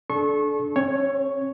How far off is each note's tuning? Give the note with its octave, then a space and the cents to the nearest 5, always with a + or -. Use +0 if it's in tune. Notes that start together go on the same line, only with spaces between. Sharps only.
D4 -5 A4 -30 C#6 -25
C4 +45 C#5 +0